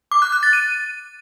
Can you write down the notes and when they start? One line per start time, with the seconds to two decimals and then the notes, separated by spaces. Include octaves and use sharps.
0.11 D6
0.22 F#6
0.32 F#6
0.43 A6
0.53 D#7